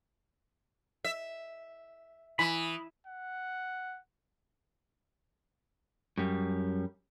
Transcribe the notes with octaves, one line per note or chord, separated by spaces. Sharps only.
E5
E3 B5 D#6
F#5
F#2 G3